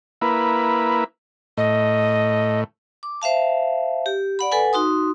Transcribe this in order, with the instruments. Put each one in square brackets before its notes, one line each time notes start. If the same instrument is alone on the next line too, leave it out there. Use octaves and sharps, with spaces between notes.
[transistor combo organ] A#3 E4 B4
[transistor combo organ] A2 [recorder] D#5
[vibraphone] D6
C5 E5 F5 A5
G4
D5 F#5 B5
A4 B4 F#5 G#5
D#4 F#4 C6 D#6